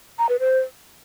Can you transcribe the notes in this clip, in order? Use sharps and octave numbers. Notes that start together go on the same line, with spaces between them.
A#5
B4
C5